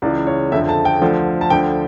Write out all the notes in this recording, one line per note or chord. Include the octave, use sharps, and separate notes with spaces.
C#2 C#3 E3 D5
C#5
F2 D3 F3 E5
A5
G5
D2 D3 F3
A5
D2 D3 F3 G5